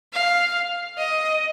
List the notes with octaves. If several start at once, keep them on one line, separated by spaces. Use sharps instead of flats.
F5
D#5